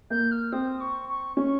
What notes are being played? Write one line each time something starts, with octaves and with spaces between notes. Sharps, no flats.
A#3 G6
F6
C4 D#6
C#6
C#6
C#4 C#6